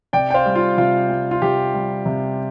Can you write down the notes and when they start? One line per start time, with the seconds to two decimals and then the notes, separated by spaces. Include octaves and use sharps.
0.13 C3 D5 G5
0.31 G5
0.34 C5 F5
0.46 G3
0.55 F4
0.78 C3 F4
1.10 G3
1.31 F4
1.42 C3 G4
1.74 G3
2.06 C3